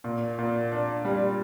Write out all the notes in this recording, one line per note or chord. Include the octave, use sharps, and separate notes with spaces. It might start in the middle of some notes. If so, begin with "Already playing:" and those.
A#2
A#2
D4
G3